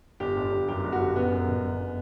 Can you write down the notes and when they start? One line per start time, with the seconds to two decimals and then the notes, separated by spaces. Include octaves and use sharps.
0.20 G1 G4
0.36 G1
0.52 G1
0.68 F#2 G4
0.84 G1
0.92 F#4
1.00 G1
1.16 F#1 B3
1.32 F#2
1.48 F#1
1.64 G1